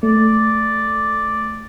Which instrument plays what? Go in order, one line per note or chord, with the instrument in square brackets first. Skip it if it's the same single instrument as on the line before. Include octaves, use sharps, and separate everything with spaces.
[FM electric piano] A3 [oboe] D5